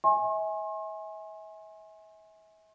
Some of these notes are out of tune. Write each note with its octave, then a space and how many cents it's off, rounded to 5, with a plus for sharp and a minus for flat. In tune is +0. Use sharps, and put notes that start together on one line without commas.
E5 -40 G#5 +0 C6 +45